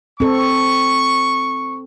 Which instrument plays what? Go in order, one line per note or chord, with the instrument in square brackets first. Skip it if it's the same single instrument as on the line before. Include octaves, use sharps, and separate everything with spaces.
[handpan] C4 A4 [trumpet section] C#6